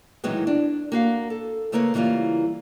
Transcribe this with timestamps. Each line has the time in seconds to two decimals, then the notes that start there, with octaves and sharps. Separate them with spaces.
0.24 A2 D#3 E3 F#3 G#3 B3
0.47 D4
0.92 A#3 F#4 F5
1.30 A4
1.72 C#3 A3 A#3 A#4 B4 C#5
1.94 C#3 E3 G3 A#3 F4